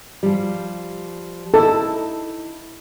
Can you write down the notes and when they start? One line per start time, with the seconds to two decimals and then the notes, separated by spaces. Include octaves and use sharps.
0.23 F3 G3
1.54 D#4 E4 A4